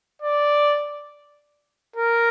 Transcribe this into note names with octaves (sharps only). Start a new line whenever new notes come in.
D5
A#4